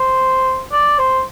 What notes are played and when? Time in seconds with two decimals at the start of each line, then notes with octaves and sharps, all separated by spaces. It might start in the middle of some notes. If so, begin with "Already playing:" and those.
Already playing: C5
0.72 D5
0.99 C5